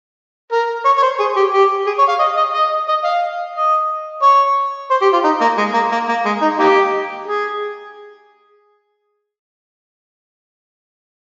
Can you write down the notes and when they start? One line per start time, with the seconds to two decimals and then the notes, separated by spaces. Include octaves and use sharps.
0.52 A#4
0.85 C#5
0.98 C#5
1.02 C5
1.20 G#4
1.37 G4
1.53 G4
1.87 G#4
1.98 C#5
2.09 F5
2.20 D#5
2.37 D#5
2.53 D#5
2.88 D#5
3.04 F5
3.56 D#5
4.22 C#5
4.91 C5
5.02 G4
5.13 F4
5.24 D#4
5.41 A#3
5.58 G#3
5.74 A#3
5.92 A#3
6.09 A#3
6.26 G#3
6.42 D#4
6.59 A#3 D#4 G4
7.27 G#4